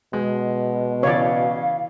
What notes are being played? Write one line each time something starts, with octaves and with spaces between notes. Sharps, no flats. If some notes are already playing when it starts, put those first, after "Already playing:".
B2 G#3
C#3 E3 C#5 D5 F5